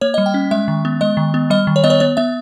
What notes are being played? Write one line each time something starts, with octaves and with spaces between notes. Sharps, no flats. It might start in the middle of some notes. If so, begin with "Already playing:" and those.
A#3 C#5
D#5
G3
G5
C#4
G#3 E5
D#3
B3
G#3 D#5
D#3
B3
G3 D#5
D#3
C#5
B3 D#5
C#5
B3 C#5
B3 E5